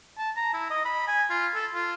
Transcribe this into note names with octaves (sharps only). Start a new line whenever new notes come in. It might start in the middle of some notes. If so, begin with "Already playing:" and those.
A5
A#5
E4
D#5
B5
G#5
F4
A4
F4